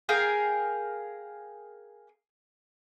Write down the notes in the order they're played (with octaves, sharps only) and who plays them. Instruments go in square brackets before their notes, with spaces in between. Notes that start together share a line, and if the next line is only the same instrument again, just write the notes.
[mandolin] G#4 A#4 F5 G5